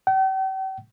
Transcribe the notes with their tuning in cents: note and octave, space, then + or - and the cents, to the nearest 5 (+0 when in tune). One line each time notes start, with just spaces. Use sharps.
G5 -40